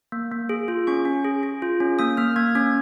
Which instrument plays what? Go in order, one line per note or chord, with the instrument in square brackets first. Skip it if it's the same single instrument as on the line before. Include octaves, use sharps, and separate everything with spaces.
[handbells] A#3
A#3
G#4
F4
C#4 C#6
C#4
G#4
G#4
F4
C#4
A#3 D#6
A#3 F6
A#3 G#6
C#4 G#6